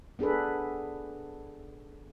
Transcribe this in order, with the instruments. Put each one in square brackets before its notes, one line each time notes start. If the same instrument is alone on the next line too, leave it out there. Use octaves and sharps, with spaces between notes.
[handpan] B3 D4 G#4 A4 B4